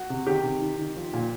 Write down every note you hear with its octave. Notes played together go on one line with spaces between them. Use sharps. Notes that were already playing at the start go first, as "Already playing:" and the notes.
Already playing: F#4
C3
D#3 G4
C3
D#3
D#3
F3
A#2